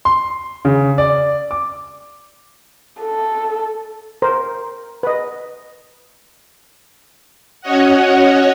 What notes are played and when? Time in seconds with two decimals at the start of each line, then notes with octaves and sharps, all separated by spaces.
0.05 C6
0.65 C#3
0.98 D5
1.51 D6
3.01 A4
4.22 A#4 C5
5.03 B4 D#5
7.61 C#4 F#4 C#5 D#5 F#5